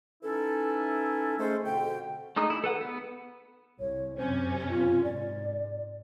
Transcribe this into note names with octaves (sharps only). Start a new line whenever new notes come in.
E3 C#4 D#4 E4 A4
G#3 A3 C#4 A4 C5
F2 B2 D3 G5
G#3 A3 D#4 D#6
E4
A4 B4 F#5
B3
C2 C#5
F#2 C3 C#4 C5
F4
G#2 D5